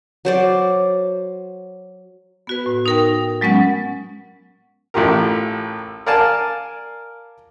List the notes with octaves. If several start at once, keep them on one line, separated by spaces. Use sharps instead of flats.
F#3 C5 D5
B3 F#4 B4
A2
D#4 A#4 G5
D#4
F#3 G#3 B3 C#4 F#5
A1 A2 F4 G4 A#4
A#4 D5 F5 G#5 A5